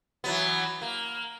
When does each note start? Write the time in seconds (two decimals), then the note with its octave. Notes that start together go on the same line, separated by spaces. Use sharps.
0.24 E3 F#3 B3
0.82 A#3